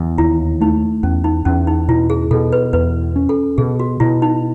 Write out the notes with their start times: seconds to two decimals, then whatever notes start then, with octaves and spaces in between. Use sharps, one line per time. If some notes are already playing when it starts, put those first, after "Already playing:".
Already playing: E2
0.18 D#2 E4
0.60 A3 D#4
1.03 E2 C#4
1.24 D#4
1.45 E2 C#4
1.67 D#4
1.88 B2 E4
2.10 G#4
2.31 B2 A4
2.52 B4
2.73 E2 B4
3.16 C#4
3.29 A4
3.58 B2 G#4
3.80 F#4
4.00 B2 E4
4.22 D#4